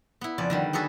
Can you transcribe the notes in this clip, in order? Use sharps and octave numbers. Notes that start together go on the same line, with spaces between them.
B3 E4
F2 C#3 D5
D3 D#3 G3
B3 F#4 G#4 A4 B4